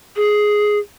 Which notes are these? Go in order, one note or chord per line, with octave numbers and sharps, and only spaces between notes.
G#4